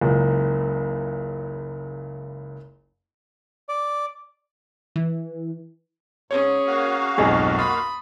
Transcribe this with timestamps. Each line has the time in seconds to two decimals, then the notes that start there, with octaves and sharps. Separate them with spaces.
0.01 F#1 C#2
3.69 D5
4.96 E3
6.31 G#2 C#4 G#4 C#5
6.67 A#3 F#4 F5
7.18 B1 F2 G#2 G#4 D#5
7.59 B5 C6 D#6 A6